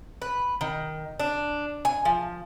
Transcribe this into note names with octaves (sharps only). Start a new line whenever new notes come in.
B4
D#3
D4
G#5
F3